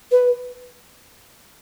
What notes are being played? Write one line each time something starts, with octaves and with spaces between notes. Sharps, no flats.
B4